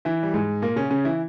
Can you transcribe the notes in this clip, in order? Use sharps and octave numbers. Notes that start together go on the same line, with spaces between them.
E3 E4
G3
G#2 G#3
A#2 A#3
C#3 C#4
C#3 C#4
E3 E4